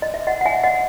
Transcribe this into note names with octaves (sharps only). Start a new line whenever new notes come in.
D#5
E5
D#5 F#5
F#5
E5 G#5
D#5 F#5